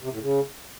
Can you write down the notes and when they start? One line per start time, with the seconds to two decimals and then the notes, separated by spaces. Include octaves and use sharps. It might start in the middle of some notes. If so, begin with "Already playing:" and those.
0.03 C3
0.12 A2
0.22 C#3